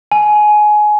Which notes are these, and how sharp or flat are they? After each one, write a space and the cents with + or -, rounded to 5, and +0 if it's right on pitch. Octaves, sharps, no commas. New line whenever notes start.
G#5 +20